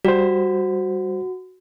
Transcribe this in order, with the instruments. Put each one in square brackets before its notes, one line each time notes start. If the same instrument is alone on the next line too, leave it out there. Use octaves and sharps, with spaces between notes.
[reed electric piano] G3 C5 [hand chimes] F#4